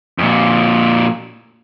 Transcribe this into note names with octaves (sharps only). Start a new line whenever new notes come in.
F2 A#2